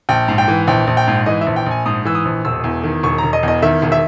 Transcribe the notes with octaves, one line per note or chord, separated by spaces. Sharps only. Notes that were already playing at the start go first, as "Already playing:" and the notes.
A#1 G5
G#2
G5
E3
A#1 G5
A#1
G5
G#2
E3 D#5
E5
A#1
G5
A#1 G#5
G#2 D#6
E3 E6
D#6
A#1
E1 E6
E2
D#3
E1 C#6
E1 A#5
D#5
E2 D#5
D#3 E5
E1
E5